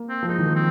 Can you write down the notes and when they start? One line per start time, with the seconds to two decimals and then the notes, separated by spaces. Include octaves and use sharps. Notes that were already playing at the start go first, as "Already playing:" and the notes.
Already playing: A#3
0.09 C4
0.23 F3
0.27 G#3 D#4
0.39 D#3
0.46 F3
0.56 C4